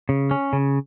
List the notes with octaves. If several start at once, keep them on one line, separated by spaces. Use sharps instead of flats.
C#3
C#4
C#3